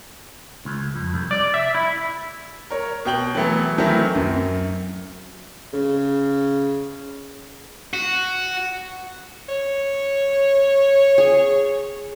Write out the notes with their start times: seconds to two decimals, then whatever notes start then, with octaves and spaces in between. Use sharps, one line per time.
0.65 C#2
0.95 F2
1.14 C2
1.31 D5
1.54 E5
1.75 E4
2.70 A#4 C#5
3.05 B2 G5 F#7
3.35 E3 F#3 A3 B3 A4
3.78 D#3 E3 F#3 A3 C4 E4
4.15 F#2
5.73 C#3
7.94 F#4
9.49 C#5
11.18 G#4